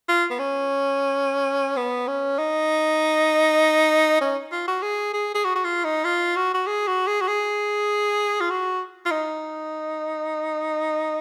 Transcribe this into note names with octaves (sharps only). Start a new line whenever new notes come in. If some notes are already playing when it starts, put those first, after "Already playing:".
F4
B3
C#4
B3
C#4
D#4
C#4
F4
F#4
G#4
G#4
G#4
F#4
F#4
F4
D#4
F4
F#4
F#4
G#4
F#4
G#4
F#4
G#4
F4
F#4
F4
D#4